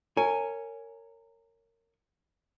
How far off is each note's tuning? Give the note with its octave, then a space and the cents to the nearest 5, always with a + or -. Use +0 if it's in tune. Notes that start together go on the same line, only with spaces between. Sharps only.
A#4 -25 C#5 +0 G#5 +0